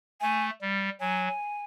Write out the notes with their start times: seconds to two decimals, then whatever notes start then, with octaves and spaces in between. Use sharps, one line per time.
0.21 A3 G#5
0.62 G3
1.00 F#3 G#5